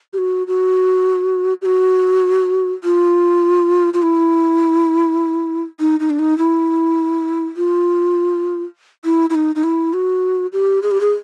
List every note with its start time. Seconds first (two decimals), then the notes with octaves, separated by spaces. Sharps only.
0.13 G4
0.18 F#4
0.47 F#4
1.62 G4
1.65 F#4
2.84 F4
3.94 F4
4.02 E4
5.80 D#4
6.00 D#4
6.10 D4
6.19 D#4
6.38 E4
7.57 F4
9.05 E4
9.30 E4
9.35 D#4
9.55 D#4
9.64 E4
9.93 F#4
10.53 G4
10.83 G#4
10.91 G4
11.01 G#4